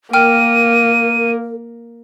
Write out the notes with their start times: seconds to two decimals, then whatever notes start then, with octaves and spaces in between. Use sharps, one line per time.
0.13 A#3 A#4 G5 F6 D#7